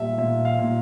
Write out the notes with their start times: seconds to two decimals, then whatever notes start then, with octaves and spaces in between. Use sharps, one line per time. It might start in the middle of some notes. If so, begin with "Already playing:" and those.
Already playing: A#2 G3 E5 A5
0.18 A#2 E5
0.45 F5
0.59 A#2